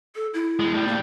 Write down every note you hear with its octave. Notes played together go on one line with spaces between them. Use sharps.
A4
E4
E2 G#3
A2 G3
A#3